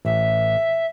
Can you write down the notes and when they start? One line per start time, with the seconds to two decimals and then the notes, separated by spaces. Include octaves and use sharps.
0.05 A1 E5